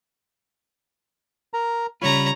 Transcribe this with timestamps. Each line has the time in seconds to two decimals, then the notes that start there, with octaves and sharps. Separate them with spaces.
1.54 A#4 A#5
2.02 C#3 G3 F4 C#5 A#5 B5